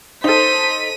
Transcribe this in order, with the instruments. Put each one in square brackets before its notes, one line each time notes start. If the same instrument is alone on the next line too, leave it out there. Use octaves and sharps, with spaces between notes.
[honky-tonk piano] D#4 A4 [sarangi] C5 [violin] B6 D#7